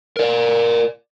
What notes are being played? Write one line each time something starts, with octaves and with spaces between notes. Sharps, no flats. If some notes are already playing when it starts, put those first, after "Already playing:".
A#4 D5